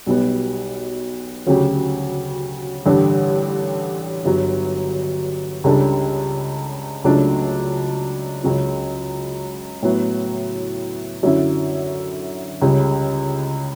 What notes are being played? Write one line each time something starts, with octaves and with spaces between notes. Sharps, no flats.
B1 B2 G3 B3
D2 C#3 F#3 C#4 G4
A1 G2 D3 G3 D4
G1 G2 F#3
C#2 C#3 G3 D4 A4
C#2 C#3 F#3 A3 D4
C#2 C#3 F#3 C#4
A2 F#3 B3 E4
F#2 D3 F#3 C#4 E4
C#2 C#3 G3